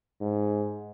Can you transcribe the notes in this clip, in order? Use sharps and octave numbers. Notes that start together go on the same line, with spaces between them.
G#2